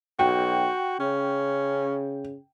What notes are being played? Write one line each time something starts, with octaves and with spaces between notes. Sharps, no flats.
B1 F#4 G5
C#3 C#4